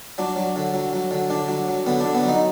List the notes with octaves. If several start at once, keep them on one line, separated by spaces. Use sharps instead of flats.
F#3 D4
F#3
D3
F#3
F#3
D3
D3 D4
F#3
F#3
D3 B3
D3 D4
B3
F#3 D#4